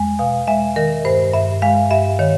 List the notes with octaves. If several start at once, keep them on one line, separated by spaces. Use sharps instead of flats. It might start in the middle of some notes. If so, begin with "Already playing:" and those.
Already playing: E2 G#3
B2 F5
G#3 E5
D#3 A#4
G2 C5
G2 E5
G#3 F5
G2 E5
D#3 C#5